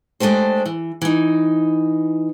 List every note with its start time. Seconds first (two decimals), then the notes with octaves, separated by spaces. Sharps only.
0.20 G#3 A3 D4 G4 C5
0.66 E3
1.01 E3 D#4